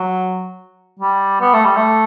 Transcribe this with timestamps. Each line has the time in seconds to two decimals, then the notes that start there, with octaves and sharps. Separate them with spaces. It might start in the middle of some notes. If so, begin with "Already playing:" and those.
Already playing: F#3
0.99 G3
1.41 B3
1.53 A3
1.65 G3
1.77 A3